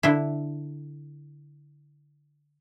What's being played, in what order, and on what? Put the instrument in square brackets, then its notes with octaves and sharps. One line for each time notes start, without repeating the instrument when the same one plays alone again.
[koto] D3 E4